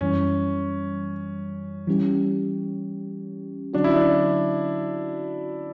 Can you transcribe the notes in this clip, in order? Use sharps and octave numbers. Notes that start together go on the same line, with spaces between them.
F#2 E3 G3 C#4
E3 G3 C#4 G4
D3 F#3 C#4 D4 F#4
E4
D4